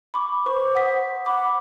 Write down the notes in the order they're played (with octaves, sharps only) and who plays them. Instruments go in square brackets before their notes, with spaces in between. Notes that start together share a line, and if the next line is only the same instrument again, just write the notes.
[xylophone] B5 C#6 D6
[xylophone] B4 C#6 D6 [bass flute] C5
[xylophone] F#5 D#6 B6
[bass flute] F#5 [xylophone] B5 D6